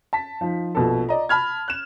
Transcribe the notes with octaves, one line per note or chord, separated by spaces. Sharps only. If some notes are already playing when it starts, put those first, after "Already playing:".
A5 B6
F3 D#4
A#1 B2 A4
D5 D#5 A#5
A5 B5 F6 G#6
F#6 E7